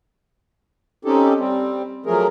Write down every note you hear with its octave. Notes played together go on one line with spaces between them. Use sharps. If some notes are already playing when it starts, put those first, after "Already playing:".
C4 C#4 D#4 G4 A4
G3 C4
F3 F#3 A3 G#4 A#4